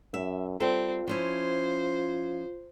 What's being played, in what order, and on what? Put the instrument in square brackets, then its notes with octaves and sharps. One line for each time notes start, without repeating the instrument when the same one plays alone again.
[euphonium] F#2 [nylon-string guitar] E5
[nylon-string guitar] G3 A4 [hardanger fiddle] C4 [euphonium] F4
[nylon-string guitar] F3 C#4 E4 [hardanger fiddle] C5